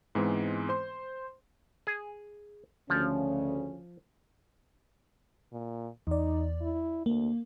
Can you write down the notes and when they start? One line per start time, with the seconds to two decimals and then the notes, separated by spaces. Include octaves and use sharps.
0.15 G#2 E3 G#3 B3 C4
0.69 C5 C6
1.87 G#4
2.90 D2 C#3 F3 C#4
5.52 A#2
6.07 E2 D#4 D5
6.61 E4
7.06 D2 A#3